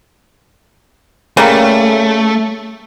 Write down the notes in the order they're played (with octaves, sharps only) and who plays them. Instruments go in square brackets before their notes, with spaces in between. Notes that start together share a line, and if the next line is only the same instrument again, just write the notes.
[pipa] C#3 G3 A#3 [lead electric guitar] A3